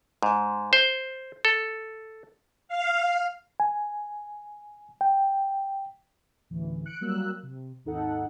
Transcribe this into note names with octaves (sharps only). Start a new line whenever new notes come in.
G#2
C5
A4
F5
G#5
G5
A1 D2 E3
F#6 C#7 D7
F#3 G3 A#3 E6 F#6
C3
G#1 D#2 D#4 A4 F#5